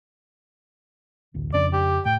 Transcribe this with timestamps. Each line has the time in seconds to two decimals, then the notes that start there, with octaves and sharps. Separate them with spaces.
1.34 D1 A1 D2
1.54 F2 C#3 D4 D5
1.73 G4
2.05 A2 G5